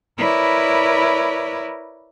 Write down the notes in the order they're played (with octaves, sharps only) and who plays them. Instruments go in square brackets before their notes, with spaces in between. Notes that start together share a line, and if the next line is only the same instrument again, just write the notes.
[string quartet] E4 A#4 B4 C#5 D5